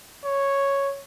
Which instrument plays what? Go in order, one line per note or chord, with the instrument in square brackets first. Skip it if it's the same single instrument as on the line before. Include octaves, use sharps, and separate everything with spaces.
[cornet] C#5